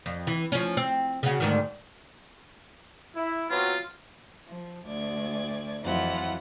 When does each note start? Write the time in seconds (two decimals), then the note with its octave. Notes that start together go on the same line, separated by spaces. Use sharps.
0.06 F2
0.27 E3
0.52 F3 C#4
0.77 C4
1.23 C#3 F#4
1.40 D2 G#2 D#3
3.16 E4
3.50 F#3 B3 C4 F4
4.48 F3
4.87 D2 D5 G#6
5.83 F2 E3 F#3 E4 F4 F#5